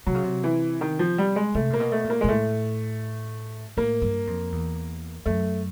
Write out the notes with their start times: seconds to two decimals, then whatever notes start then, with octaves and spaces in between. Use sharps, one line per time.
0.06 C3 F#3
0.15 C#3
0.23 C3
0.44 E3
0.81 D#3
0.99 F3
1.18 G3
1.36 G#3
1.54 C3 A3
1.70 A#2 A#3
1.80 B2
1.92 A3
2.04 A#2
2.10 A#3
2.21 G#3
2.24 A#2
2.29 A2 A3
3.77 A2 A#3
4.02 G2
4.27 F2
4.52 E2
5.26 F#2 A3